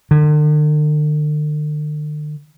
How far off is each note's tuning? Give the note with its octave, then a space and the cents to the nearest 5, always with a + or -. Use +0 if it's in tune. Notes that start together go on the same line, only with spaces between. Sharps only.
D3 +45